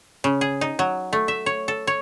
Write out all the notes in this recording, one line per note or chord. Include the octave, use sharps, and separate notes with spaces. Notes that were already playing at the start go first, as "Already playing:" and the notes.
C#3
G#4
D#4
F#3
A3
E5
C#5
A4
C#5